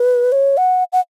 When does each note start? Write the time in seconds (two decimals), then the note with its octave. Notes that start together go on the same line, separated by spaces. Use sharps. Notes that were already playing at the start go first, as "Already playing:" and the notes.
Already playing: B4
0.32 C#5
0.57 F#5
0.93 F#5